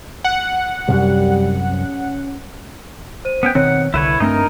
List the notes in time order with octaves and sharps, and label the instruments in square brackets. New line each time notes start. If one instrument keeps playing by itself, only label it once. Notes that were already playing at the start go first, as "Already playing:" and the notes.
[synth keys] F#5
[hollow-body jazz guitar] C2 F#2 [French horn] G3
[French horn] C#4
[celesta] C5 D#7
[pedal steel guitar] B3 C#4 G5 [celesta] F#6 B6
[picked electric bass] B2 D#3 C4 [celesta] C#5 F#6 [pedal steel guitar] F#5
[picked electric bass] C2 D3 [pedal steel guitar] E4 B4 C#5 [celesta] B5 E7
[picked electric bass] G2 A3 C4 [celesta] D4 [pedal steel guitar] D#4 A#4